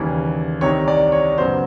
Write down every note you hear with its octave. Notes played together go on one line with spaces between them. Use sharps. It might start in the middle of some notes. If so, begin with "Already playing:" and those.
Already playing: D#2 C#3 E3 G3
C2 C3 D#3 C#5
D5
C#5
F#2 C#3 F#3 B3 C5